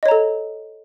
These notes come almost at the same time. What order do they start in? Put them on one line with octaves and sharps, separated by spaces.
D#5 C#5 A#5 A4